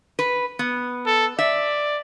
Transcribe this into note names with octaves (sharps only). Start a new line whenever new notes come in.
B4
B3
A4
D5 E5